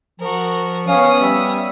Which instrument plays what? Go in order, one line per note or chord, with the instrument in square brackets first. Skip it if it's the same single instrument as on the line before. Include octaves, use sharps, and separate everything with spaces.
[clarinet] F3 [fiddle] F#4 A#4
[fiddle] B3 D#6 [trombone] C#4 [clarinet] F5
[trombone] G3 [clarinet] E5